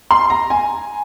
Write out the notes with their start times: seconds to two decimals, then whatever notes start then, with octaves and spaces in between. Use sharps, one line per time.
0.11 C6
0.30 A#5
0.50 G#5